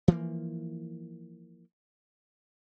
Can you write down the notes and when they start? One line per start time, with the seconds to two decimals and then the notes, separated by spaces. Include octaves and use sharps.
0.08 E3 F3 A#3